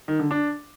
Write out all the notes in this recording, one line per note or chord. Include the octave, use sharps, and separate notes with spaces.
D#3
D3
D4